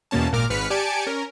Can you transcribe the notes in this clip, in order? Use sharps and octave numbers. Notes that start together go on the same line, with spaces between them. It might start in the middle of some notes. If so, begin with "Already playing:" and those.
E2 B2 A#3 C#4 A5
G#1 A#2 A#4 D6 F6
G#1 G#2 B4 F6 B6 C#7
G4 D5 G#5 A5 C#7 D7
C#4 A#4